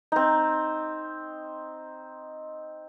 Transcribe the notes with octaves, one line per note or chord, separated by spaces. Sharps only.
C4 D#4